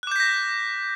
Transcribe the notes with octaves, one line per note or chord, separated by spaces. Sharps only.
D6 F#6 G6 A#6 B6